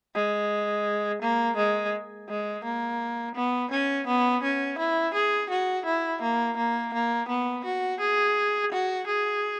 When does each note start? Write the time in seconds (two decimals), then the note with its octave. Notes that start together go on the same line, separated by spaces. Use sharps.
0.15 G#3
1.22 A#3
1.57 G#3
2.29 G#3
2.64 A#3
3.35 B3
3.71 C#4
4.07 B3
4.43 C#4
4.78 E4
5.14 G#4
5.50 F#4
5.85 E4
6.22 A#3
6.57 A#3
6.94 A#3
7.28 B3
7.65 F#4
8.00 G#4
8.72 F#4
9.07 G#4